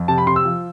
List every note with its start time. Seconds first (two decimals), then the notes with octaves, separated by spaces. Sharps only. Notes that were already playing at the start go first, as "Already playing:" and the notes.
Already playing: F2
0.08 C3 A5
0.18 B5
0.27 C3 C6
0.36 E6
0.45 F3